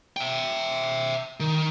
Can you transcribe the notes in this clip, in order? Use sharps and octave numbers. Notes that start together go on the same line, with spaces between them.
E5 G5
D#3